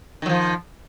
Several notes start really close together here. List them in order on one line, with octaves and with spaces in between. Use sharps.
D#3 F#3 F3